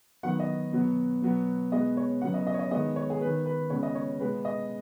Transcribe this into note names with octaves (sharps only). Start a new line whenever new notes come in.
D#3 F#3 B3 F#5
D#5
B2 F#3 B3
B2 F#3 B3
B2 G#3 B3 D#5
C#5
C#3 F#3 B3 F#5
D#5
D#5
C#5
D#5
D#3 G#3 B3 D#5
C#5
G#4
D#3 B3 B4
B4
C#3 G#3 B3 C#5
D#5
C#5
B2 G#3 B3 B4
D#5